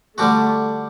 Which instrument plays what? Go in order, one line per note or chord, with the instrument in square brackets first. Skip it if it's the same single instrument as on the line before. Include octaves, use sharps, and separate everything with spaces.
[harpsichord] D3 G3 D4 F#4 [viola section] A3